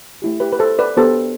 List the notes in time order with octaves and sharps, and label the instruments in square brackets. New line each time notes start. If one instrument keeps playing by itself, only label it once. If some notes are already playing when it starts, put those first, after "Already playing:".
[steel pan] A3 E4 G4
G4 B4
B4
A4 C5
B4 D5
B3 D4 G4 A4 C5